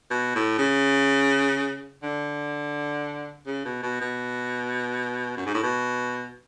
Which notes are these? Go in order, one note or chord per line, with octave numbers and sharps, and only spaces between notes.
B2
A2
C#3
D3
C#3
B2
B2
B2
F#2
G#2
A2
B2